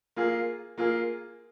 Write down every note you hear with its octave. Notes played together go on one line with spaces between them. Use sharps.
A#3 F4 G#4
A#3 F4 G#4